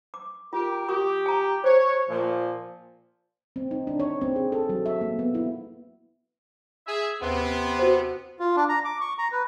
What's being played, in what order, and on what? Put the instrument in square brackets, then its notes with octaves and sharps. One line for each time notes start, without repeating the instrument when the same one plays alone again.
[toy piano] D6
[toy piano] F4 [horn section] G4 A#4
[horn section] G4 [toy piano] C#6 D#6
[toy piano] G#5 A#5
[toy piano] C5 [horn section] C#5
[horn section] A#2 F3
[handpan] C4
D#4
D4
C#5
C4
G#4
A4
F#3
E5
A#3
B3
E4
[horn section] G#4 E5
[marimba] D#2 [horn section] C3 B3
[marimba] F#4 C5
[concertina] F4
D4
A#5
D6
C#6
A#5
B4